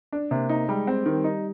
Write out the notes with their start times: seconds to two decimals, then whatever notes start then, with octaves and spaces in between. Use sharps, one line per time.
0.12 D4
0.31 C3 A#3
0.49 D#4
0.68 G3 G#3
0.87 C4
1.06 D#3 G3
1.24 D#4